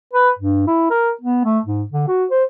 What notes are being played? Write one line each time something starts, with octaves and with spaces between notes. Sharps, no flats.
B4
G2
E4
A#4
B3
A3
G#2
D3
F#4
C5